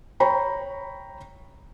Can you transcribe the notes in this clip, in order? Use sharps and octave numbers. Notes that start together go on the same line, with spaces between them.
C#5 G5 A#5 B5 C#6